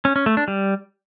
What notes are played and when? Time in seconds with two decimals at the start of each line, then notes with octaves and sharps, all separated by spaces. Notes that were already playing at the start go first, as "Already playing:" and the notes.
0.05 C#4
0.16 C#4
0.26 A3
0.37 D4
0.48 G3